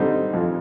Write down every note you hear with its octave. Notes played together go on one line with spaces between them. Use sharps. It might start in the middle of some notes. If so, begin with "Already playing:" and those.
Already playing: D3 G3 C4 D#4
F2